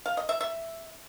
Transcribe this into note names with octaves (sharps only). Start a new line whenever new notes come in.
F5
D#5
E5
E5